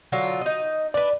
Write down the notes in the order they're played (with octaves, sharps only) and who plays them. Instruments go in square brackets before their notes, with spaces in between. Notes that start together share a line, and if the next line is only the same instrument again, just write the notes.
[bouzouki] D3 F#3 F4
D#4 D#5
[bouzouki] D4 B4 [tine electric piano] D5